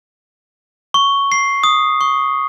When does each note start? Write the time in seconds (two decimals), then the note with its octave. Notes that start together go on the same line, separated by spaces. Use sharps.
0.94 C#6
1.32 C7
1.63 D#6
2.01 C#6